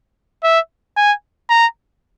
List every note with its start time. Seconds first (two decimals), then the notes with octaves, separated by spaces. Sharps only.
0.43 E5
0.96 G#5
1.50 A#5